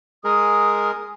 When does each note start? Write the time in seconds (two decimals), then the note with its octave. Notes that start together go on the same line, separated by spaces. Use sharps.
0.24 G#3 G#4 A#4 D#6